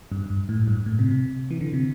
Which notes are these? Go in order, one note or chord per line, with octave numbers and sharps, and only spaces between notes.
G2
G2
A2
G2
A2
C3
C3
E3
D3
C3